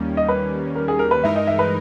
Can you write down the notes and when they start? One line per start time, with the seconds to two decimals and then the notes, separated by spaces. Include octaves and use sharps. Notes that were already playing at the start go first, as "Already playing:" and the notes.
Already playing: D#2 D#3 G3 A#3 C#4
0.17 D#5
0.29 B4
0.76 A#4
0.88 G#4
0.99 A#4
1.11 B4
1.23 G2 E3 G#3 D#4 A#4 E5
1.36 D#5
1.47 E5
1.59 B4